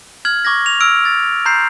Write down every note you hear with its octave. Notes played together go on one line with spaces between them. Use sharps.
F6 G#6 F#7
C#6 D6 G#6 A#6
F7
E6 F6 D7
A6
A#5 C6 G6 C7